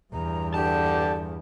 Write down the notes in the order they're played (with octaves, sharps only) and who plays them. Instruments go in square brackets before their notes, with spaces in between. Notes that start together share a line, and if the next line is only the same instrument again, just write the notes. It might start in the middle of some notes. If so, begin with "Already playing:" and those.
[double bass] E2 G2 [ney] A#5
[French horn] D3 [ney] G4 [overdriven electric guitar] A5